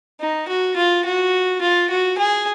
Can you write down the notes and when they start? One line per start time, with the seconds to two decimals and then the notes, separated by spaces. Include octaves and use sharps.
0.20 D#4
0.48 F#4
0.76 F4
1.05 F#4
1.61 F4
1.90 F#4
2.18 G#4